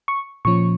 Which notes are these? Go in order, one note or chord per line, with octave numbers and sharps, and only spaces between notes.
C#6
A#2 F3 C#4 C#6